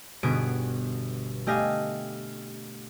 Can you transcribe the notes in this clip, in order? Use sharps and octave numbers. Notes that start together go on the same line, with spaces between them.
G1 B2 B3 G#4 D7
A3 G4 D#5 F5 G#5